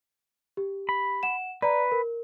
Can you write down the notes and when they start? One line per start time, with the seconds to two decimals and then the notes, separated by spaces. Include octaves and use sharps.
0.57 G4
0.89 B5
1.23 F#5 E7
1.62 B4 D5 A#5
1.92 A#4